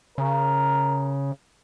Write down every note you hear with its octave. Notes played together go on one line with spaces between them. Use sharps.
C#3 A#4